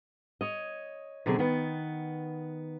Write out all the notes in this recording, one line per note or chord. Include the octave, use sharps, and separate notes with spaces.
C#5 D#5
B2 D3 F#3 C4 G#4
D#3 B3